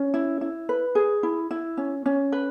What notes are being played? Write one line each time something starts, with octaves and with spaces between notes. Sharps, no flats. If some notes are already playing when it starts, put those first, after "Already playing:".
Already playing: C#4
E4
E4
B4
G#4
E4
E4
C#4
C#4
B4